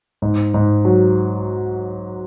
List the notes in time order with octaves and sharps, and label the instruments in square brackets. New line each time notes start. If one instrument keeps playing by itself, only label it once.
[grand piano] G#2
G#2
F#3